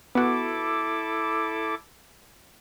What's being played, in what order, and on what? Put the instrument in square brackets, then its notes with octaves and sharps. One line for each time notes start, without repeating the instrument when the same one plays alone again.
[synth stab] B3 F#4 [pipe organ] E4 A4 D6